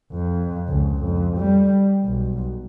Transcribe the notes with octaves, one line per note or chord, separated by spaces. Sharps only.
F2
C#2
F2
G3
B1